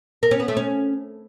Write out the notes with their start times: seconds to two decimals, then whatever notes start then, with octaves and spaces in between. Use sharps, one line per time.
0.23 A#4
0.31 C#4
0.40 B3
0.48 A3
0.57 C#4